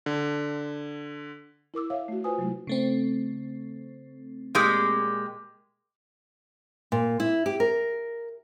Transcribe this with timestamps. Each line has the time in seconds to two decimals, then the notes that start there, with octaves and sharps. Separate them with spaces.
0.06 D3
1.74 E4 A#4 D6 E6
1.90 C#5 E5 F5
2.08 A3 F#4
2.24 F4 B4 C5 G#5 D#6
2.38 C3 F#3 G#3 A3 E4
2.67 C#3 A3 C4
4.55 A#2 G#3 G4
6.92 A#2
7.20 E4
7.46 G4
7.60 A#4